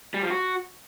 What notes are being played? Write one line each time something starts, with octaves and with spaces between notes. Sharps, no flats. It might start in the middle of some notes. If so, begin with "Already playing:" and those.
G3
F3
F#4